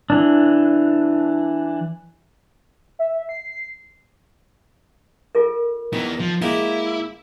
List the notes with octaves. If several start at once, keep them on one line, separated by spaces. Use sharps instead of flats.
E3 D4
E5
C7
F4 A4 A#4
D#3 E3 B3
F3
G#3 A#3 E4 G4